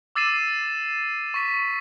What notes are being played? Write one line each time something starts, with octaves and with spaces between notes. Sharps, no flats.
D6 E6 A6 C7 D#7 E7
C#6 B6